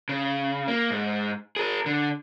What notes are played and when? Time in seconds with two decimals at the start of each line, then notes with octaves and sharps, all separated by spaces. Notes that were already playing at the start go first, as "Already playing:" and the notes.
0.09 C#3
0.68 A#3
0.91 G#2
1.56 G#4 A#4
1.86 D3